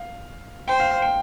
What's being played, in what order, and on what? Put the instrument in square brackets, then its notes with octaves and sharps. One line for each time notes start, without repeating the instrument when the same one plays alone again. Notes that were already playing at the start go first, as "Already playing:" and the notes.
Already playing: [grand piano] F5
[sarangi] C5 [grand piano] G5
[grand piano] F5
F5
G5